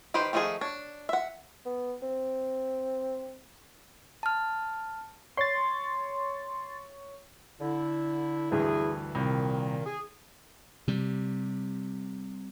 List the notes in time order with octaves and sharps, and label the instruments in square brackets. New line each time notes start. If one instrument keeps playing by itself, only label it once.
[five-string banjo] D#3 G4 B4 C5 G5
D#3 F3 A3 D#4 G#4
D4 C#5
E5 F#5
[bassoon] B3
C4
[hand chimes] A5 F6
[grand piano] C#5 [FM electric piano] C6 A6
[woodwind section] D3 E4
[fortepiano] D2 G2 E3 [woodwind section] E4 G#4
[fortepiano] C2 [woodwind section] A#2 D#3
[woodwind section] G#4
[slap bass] C3 G3